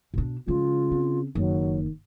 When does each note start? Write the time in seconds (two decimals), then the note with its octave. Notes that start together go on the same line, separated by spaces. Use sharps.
0.14 B2 D4
0.48 C#3 F3 G#3 F4
0.91 C4
1.35 F#1 D#3 F#3